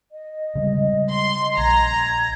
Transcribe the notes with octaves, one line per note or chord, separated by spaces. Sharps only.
D#5
C#3 G3 G#3
C6
A#1 A#5 G#6